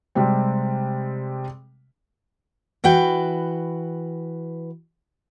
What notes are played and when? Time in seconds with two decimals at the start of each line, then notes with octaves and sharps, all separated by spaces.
0.15 C3 G3 G#3 C4
2.84 E3 F#4 B4 G5